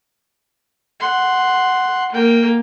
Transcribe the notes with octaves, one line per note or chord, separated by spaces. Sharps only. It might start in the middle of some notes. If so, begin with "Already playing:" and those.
F#5 C6
A#3 G5